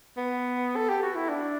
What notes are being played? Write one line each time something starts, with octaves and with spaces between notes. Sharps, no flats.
B3
A4
G4
F#4
E4
D4